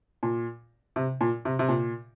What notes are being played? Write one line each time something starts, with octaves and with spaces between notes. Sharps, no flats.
A#2
C3
A#2
C3
C3
A#2